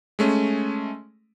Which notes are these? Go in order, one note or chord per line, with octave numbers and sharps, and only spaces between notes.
G#3 A3 C#4